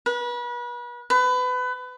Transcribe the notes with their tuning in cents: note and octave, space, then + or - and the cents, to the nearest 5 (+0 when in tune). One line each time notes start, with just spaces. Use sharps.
B4 -35
B4 +25